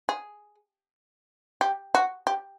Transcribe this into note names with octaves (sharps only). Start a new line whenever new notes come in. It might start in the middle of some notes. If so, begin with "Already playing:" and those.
G#4
G4
F#4
G4